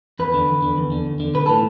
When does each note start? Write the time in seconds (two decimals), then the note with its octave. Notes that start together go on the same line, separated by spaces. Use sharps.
0.19 E2 B4
0.34 D3
0.49 E2
0.63 D3
0.78 E2
0.92 D3
1.06 E2
1.20 D3
1.34 B1 B4
1.46 A2 E3 A4